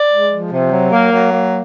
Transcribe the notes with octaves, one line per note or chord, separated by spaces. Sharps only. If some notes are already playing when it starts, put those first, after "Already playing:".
Already playing: D5
G#3
F3
C3
F#3
A#3
F#3
A#3